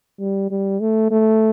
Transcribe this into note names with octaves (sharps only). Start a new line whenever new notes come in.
G3
G3
A3
A3